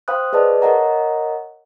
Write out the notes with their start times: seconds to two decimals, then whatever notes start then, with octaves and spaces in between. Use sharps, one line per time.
0.08 C5 F5 G5 B5 D#6 F#6
0.33 G#4 B4 D5 D#5 A5
0.62 A#4 C#5 D#5 F#5 A#5